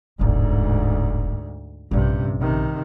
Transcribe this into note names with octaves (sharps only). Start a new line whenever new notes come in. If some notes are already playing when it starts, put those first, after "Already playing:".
E1 A1 D2 G#2
A#1 G2 C3 C#4
C3 D#3